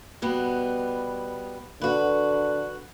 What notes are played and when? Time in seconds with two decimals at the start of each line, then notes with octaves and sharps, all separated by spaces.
0.22 B2 G3 B3
1.81 D3 F#4 B4